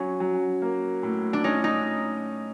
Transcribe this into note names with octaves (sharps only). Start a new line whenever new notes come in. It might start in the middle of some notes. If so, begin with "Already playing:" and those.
Already playing: F#3 C#4
F#3
A#3
A2
D4
C#4 D#4
D#4